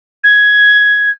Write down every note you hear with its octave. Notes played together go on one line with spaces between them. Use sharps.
G#6